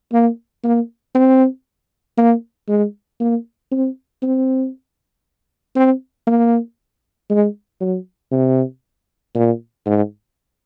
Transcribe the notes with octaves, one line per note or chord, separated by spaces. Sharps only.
A#3
A#3
C4
A#3
G#3
A#3
C4
C4
C4
A#3
G#3
F#3
C3
A#2
G#2